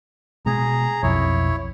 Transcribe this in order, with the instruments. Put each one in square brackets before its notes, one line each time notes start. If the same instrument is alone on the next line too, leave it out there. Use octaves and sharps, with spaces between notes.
[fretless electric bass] B2 G#3 [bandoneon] G#4 A#5
[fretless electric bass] B1 F2 [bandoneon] E4 C#5